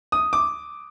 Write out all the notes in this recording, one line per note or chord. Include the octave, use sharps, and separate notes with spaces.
D#6
D6